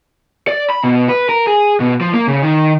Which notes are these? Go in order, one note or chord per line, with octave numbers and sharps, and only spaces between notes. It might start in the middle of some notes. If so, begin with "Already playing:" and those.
D5
B5
B2
B4
A#4
G#4
B2
F3
A#3
C#3
D#3